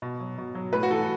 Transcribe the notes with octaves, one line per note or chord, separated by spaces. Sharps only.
B2
F#3
B2
F#3
A2 B4
F#4
E3 A4